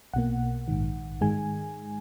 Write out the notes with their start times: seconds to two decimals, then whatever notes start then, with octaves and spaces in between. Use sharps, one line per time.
0.14 B1 B2 A#3 F#5
0.68 A#1 G#2 D#3
1.21 G#2 D#3 G#3 G#5